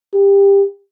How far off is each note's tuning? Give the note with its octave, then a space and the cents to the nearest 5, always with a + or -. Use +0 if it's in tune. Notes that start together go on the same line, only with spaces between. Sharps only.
G4 +20